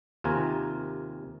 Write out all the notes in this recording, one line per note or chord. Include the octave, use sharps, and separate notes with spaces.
D#2 C3 F4 A#4 G#5